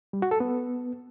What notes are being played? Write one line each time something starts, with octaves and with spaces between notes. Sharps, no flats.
G3
F#4
A4
B3